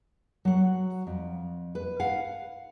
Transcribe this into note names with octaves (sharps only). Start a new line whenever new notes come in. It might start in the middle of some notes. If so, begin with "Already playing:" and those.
F#3 F#5
F2
B4
F5 F#5